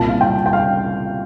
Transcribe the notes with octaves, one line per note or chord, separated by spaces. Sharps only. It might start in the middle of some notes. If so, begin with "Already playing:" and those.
Already playing: C2 A#2 G3 A5
F5
G5
G5
F5